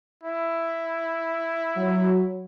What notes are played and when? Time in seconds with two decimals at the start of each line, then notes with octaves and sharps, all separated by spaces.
0.23 E4
1.77 F#3